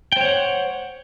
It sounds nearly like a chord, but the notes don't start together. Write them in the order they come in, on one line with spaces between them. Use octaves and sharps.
G5 C5 C#5 F#5